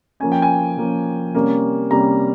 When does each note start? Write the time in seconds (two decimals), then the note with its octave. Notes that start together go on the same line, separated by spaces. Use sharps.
0.20 F3 A#3 C#4 G#5
0.32 G5
0.42 G#5
0.77 F3 A#3 C#4
1.34 C3 G3 A#3 C#4
1.91 C3 G3 A#3 C#4 A#5